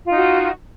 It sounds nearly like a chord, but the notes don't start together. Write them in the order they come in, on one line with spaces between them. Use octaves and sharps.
F4 D#4 F#4